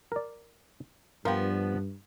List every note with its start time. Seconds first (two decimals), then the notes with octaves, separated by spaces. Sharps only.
0.12 A#4 D5
1.25 G2 F3 B3 A#4 F5 G5